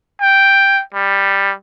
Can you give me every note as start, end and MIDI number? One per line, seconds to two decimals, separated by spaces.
0.21 0.82 79
0.94 1.53 55